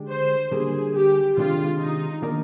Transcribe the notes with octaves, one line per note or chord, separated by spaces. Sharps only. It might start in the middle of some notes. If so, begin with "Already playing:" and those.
Already playing: D3 G#3 D4 G4
C5
D3 G3 A#3 G#4
G4
C3 D#3 G#3 D4 F4 G4
D#4
D#3 A#3 D4 F4 A#4